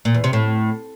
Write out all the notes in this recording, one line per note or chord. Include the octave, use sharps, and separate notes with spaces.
A#2
E2
C3
A2